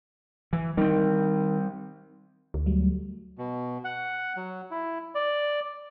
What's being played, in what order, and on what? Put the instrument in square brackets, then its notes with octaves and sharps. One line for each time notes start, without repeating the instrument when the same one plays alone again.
[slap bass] E3
[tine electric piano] D#3 [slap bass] G3 C4
[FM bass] D2
[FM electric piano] F#3 G3 A3
[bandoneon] B2
F#5
F#3
E4
D5